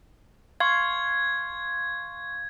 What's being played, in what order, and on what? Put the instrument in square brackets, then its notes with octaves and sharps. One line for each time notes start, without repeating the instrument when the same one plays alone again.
[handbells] F5 C6 C#6 [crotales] G#6